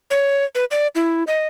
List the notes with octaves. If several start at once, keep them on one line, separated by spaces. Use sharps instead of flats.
C#5
B4
D5
E4
D#5